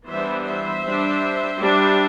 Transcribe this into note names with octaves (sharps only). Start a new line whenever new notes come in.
E3 G3 B3 D4 C5 E5
C5 E5
G3 D4
G3
D4